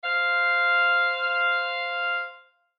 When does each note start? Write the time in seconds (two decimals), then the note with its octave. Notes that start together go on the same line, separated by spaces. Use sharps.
0.04 C5 F5